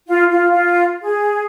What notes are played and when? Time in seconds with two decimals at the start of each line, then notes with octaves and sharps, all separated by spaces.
0.07 F4
0.30 F4
0.51 F4
1.03 G#4